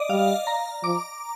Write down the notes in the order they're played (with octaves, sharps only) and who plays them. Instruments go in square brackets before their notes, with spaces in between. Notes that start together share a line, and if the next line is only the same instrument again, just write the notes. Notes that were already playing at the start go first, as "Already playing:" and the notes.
Already playing: [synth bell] D5 D#5
[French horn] G3 [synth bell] F5
[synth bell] A#5
[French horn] F3 [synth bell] D6